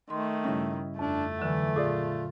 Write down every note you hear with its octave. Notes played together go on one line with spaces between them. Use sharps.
D#3 A3 C6
G2 C#3 G3 C#4 E4
F2 A3 D4
D3 E3 F#3
A#2 F4 G#4 D5